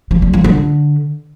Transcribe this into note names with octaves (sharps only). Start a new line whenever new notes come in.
F3
G3
F3
D3